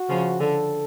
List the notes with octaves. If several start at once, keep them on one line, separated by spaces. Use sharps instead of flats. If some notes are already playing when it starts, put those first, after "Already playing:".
Already playing: F#4
C#3 F3
D3 A4